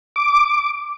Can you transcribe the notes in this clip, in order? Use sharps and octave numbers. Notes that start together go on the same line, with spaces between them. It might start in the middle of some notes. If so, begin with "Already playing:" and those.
D6